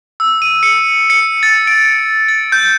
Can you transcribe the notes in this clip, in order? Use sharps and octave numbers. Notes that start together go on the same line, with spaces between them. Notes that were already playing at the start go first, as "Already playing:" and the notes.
E6
D#7
C#7
C#7
A6
D7
A6
G6